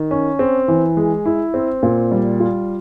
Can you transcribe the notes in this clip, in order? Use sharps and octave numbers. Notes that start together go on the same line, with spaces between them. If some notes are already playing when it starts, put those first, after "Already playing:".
Already playing: D#3
C#4
C4
E3
G#3
E4
C4
A#2
G3
F4